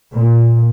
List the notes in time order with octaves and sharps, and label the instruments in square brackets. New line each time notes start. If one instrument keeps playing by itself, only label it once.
[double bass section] A#2